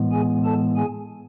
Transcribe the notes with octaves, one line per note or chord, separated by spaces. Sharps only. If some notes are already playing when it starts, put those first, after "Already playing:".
Already playing: A2 E3 G#3 B3
G#4 G#5
A4 A5
G#4 G#5